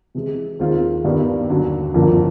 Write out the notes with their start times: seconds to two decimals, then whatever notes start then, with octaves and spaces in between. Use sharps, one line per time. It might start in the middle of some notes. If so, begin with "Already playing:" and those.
0.15 C3 E3 G#3
0.59 D#2 D#3 G#3 C4 F4
1.04 G2 D#3 G3 B3 D4
1.49 D#2 D3 F#3
1.94 G1 F2 D3 F3 A#3